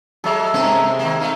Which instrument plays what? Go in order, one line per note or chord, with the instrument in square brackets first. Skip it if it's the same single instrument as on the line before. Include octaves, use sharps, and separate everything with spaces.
[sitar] F#3 G#3 [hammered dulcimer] A4 E5
[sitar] G2 A#3 C#4 [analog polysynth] C3 G#3 C4
[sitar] D#3 A#3
[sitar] A3 D#4 [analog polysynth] F5